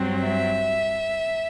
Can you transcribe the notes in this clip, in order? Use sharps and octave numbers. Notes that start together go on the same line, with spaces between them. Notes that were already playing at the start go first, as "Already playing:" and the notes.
Already playing: G2 F#3 C4
E5